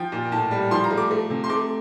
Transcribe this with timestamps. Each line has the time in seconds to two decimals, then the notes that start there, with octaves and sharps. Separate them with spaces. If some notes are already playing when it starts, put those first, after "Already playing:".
Already playing: F3 G5
0.12 A#2
0.32 A2 A5
0.51 G3
0.71 F3 C6
0.84 A#5
0.90 A3
0.97 D6
1.11 A3
1.30 C3
1.44 C6
1.49 A3 D6